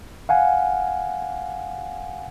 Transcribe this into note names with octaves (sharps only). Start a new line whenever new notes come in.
F5 F#5 G#5